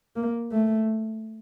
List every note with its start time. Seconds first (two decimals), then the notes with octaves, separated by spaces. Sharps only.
0.16 A#3
0.52 A3